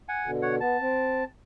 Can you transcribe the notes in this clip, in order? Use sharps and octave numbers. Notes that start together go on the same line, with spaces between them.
F#5 G#5
B2 D3
C#5 F#5
B3 A5
C4